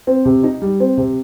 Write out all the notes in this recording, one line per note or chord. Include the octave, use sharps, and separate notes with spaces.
C4
C3
D#4
G3
C4
C3